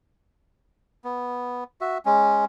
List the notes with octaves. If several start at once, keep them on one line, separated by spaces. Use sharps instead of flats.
B3
F#4 E5
G#3 C#4